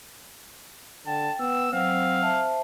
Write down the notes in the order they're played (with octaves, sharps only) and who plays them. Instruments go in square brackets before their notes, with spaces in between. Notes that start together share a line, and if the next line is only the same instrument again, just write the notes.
[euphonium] D3 [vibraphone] G5 [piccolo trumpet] A5
[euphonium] B3 [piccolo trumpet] E6
[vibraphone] F#3 F#5 E6 [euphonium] C4 [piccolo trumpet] F5
[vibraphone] C5 E5 A5